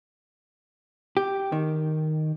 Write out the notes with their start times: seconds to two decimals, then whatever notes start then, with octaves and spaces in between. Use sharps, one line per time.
1.17 G4
1.52 D#3